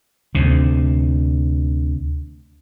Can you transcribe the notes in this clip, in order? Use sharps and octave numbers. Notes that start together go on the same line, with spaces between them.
D2 C3